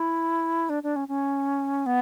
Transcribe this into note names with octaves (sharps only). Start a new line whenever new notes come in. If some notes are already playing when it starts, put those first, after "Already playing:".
Already playing: E4
D4
D4
C#4
C#4
B3